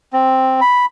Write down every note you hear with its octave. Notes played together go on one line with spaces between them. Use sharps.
C4
B5